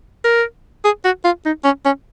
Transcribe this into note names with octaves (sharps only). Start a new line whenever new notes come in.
A#4
G#4
F#4
F4
D#4
C#4
C#4